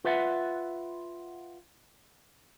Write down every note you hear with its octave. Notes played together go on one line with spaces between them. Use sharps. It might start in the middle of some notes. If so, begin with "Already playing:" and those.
F4 B4 E5 F#5